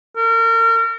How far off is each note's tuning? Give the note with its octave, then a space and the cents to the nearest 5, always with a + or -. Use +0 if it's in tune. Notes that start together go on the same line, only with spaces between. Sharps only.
A#4 -35